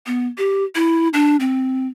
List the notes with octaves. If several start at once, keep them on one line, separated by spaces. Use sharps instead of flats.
B3
G4
E4
D4
C4